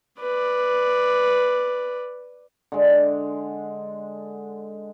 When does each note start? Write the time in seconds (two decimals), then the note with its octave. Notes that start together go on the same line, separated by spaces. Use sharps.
0.20 B4 D5
2.72 D3 G#3